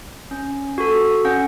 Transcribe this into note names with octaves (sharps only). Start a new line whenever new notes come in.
C#4
F#4 A4
C#4 F#5